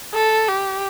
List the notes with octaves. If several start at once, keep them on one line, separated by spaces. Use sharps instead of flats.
A4
G4